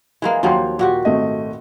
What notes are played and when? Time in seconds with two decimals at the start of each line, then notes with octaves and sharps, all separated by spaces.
0.22 E3 G#3 A#3
0.43 D#2 F3 F#3 A#3 G5 C6
0.79 A#2 F#4 G4
1.05 G#1 A3 D#5